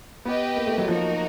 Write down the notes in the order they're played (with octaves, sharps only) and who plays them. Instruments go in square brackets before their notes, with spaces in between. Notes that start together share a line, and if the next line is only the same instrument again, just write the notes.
[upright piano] B3 [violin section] G4 B4 D#5 G5
[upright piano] A#3
A3
F#3
[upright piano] F3 [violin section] A#3 D#4 F#4 A#4